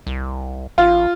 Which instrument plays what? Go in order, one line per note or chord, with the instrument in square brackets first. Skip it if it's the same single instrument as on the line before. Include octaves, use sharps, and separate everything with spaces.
[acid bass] C2
[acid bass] A1 [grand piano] F4